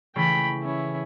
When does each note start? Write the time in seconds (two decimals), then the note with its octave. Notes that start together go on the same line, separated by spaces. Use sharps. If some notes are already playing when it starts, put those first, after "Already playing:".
0.16 C#3 E3 A3 G5 B5
0.63 C#4 E4